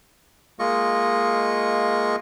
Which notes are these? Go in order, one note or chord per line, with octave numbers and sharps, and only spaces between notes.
G#3 A#3 F4 D#5 C#6